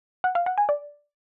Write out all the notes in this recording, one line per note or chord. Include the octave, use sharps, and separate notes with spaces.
F#5
F5
F#5
G#5
D5